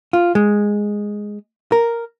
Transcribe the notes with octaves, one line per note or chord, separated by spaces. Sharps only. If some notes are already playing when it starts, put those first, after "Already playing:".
F4
G#3
A#4